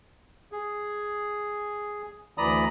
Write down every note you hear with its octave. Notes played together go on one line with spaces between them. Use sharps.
G#4
D2 E3 D5 A#5 B5 D#6